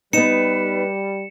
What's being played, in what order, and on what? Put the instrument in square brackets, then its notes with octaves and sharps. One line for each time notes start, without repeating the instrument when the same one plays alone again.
[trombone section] G3 [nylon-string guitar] B3 D#4 [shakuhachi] B4 [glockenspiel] C#7 E7